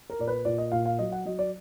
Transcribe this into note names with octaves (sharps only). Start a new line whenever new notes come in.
A#4
A#2 D5
B4
A#2 D5
D#5
A#2 F5
F5
F#3 D#5
F#5
F#3 D#5
D5